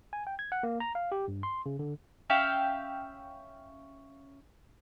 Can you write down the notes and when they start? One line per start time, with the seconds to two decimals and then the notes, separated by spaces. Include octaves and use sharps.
0.13 G#5
0.27 G5
0.39 G#6
0.52 F#5
0.63 A#3
0.80 A#5
0.95 F5
1.12 G4
1.28 G2
1.43 C6
1.66 C#3
1.79 D3
2.30 C#4 E5 F5 G5